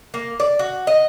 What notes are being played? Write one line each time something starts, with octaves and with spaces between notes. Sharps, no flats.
A#3
D5
F#4
D#5